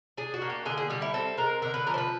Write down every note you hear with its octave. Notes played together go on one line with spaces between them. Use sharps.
D4 G#4
F#4
A#3
G4
D3 G#4
G#4
G3 G4
E4
C4 A4
G#3 A#4
D3 A#4
B4
F3 A#4
C5
B4